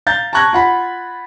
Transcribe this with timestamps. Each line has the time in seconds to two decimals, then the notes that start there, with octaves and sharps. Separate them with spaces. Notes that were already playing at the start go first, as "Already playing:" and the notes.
0.07 F5 A#5 G6 A6
0.33 A5 A#5 C#6 F#6 G#6 A#6
0.53 F4 F#5 B5